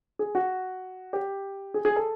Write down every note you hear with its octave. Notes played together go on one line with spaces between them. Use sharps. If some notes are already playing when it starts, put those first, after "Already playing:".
G#4
F#4
G4
G#4
G#4
A4